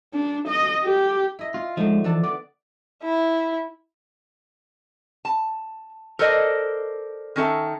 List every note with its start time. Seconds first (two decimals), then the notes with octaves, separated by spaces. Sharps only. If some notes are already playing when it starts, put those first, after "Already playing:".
0.13 D4
0.48 D#5
0.84 G4
1.39 E4 D#5
1.54 F4
1.77 D3 F3 G#3 A3 D#4
2.04 E3 D4 A4 A5
2.23 B3 D5 D6
3.03 E4
5.25 A5
6.19 A4 A#4 C5 D5 D#5
7.36 D#3 C#4 A4 E5